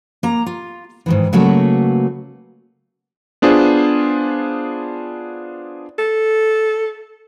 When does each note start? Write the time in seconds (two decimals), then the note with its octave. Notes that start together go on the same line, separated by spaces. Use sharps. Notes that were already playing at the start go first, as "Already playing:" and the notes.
0.23 A#3 A#5
0.46 F4
1.06 G#2 D#3 E3
1.33 C#3 F#3 A3 A#3 F#4 B4
3.42 B3 D4 F4 G#4 C5
5.99 A4